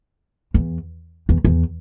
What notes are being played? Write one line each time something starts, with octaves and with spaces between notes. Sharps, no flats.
E2
E2
E2